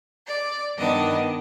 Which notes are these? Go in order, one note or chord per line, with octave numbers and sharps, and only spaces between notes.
D5
G2 D#3 B3 D4 D#5